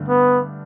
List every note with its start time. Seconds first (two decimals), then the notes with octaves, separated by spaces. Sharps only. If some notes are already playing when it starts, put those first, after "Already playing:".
Already playing: G2 D3 A3 D4
0.08 B3